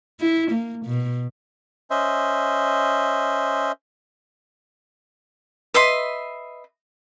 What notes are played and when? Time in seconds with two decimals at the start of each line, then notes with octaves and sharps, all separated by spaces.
0.20 E4
0.51 A#3
0.86 B2
1.90 C#4 C5 D#5 E5
5.74 B4 D#5 E5 C6